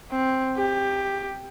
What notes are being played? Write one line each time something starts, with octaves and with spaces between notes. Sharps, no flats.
C4
G4